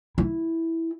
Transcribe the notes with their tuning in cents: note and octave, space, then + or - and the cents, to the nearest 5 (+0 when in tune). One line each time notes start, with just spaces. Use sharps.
E4 -5